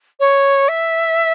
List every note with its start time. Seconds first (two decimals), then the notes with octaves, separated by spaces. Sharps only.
0.20 C#5
0.68 E5